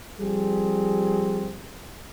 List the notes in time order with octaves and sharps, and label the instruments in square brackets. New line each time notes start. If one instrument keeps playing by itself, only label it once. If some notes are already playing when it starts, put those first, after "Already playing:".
[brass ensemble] F3 G3 C4 G#4